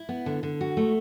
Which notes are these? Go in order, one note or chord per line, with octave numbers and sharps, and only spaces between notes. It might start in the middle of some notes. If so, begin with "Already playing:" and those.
Already playing: E4
B3
D3
D3
F#4
A3